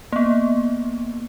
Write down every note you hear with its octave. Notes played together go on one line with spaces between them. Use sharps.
A#3 B3